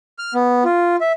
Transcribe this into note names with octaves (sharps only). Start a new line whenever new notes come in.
F6
B3
F4
E5